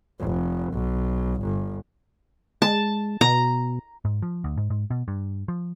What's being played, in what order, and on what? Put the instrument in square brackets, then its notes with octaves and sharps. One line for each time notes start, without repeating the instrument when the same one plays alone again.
[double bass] F1
B1
G1
[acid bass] G#3 [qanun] A5
[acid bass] B2 [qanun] A#5
[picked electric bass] G#2
F3
D2
G#2
G#2
B2
G2
F3